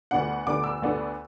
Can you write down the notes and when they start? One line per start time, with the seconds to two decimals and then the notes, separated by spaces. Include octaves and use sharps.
0.11 D2 D3 B3 D4 F#5
0.46 D2 D3 B3 D4 D6
0.64 E6
0.82 D2 D3 B3 D4